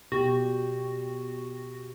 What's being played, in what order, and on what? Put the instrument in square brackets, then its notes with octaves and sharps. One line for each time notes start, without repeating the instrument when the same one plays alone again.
[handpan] B2 G4 [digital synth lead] F#4